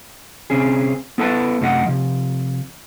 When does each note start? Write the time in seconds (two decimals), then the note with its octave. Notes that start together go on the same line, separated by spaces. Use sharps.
0.50 C2 C3 C4 C#4 G#4
1.18 B3 E4 A4 B4 F#5 A5
1.61 F#2 C3 A3 D#4 A4 F#5
1.85 C3 F3